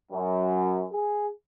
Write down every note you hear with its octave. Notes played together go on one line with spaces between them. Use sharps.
F#2
G#4